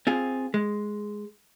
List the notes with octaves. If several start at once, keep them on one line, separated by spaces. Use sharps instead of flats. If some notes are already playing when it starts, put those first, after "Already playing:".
C4 F4 G#4
G#3